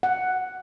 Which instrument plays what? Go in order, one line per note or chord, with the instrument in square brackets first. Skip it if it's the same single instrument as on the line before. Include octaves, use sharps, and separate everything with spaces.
[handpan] F#5